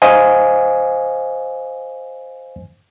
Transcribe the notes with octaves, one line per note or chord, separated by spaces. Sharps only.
C5 D#5 F5 G#5